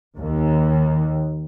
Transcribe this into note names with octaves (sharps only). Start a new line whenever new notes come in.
D#2